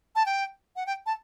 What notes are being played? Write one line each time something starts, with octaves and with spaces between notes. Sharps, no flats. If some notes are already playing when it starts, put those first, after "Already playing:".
A5
G5
F#5
G5
A5